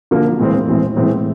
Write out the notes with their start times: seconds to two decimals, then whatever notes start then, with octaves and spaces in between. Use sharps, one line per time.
0.11 D3 F3 A#3
0.39 A2 E3 G#3 C4
0.68 A2 E3 G#3 C4
0.96 A2 E3 G#3 C4